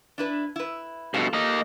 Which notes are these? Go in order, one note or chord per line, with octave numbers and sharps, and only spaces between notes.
D4 E4 B4
E4 B4
G2 B2 F4 A4
A#3 D#5